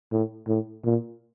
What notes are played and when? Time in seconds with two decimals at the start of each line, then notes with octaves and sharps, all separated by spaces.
0.12 A2
0.48 A2
0.85 A#2